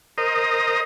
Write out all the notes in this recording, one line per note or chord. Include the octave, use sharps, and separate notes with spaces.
A#4 C5 D#5 A#5 D#6